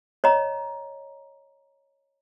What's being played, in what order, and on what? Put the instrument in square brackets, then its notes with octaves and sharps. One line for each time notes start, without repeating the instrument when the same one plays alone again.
[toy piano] C#5 D#5 A#5